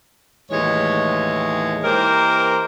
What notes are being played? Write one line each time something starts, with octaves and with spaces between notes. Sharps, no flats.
D#2 A2 E3 G#3 C#5
E3 A#3 G4 A#4 C5 D#5